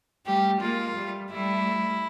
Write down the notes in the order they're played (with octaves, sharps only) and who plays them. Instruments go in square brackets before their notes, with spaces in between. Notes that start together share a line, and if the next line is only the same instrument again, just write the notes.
[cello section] G3 A3 [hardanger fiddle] G4
[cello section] G#3 A#3 [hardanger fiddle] F4
[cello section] G3 A3
[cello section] G3 A3 [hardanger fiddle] E4